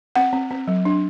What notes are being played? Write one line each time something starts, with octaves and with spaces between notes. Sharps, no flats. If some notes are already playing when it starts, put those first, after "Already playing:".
C4 F#5
C4
C4
F#3
D4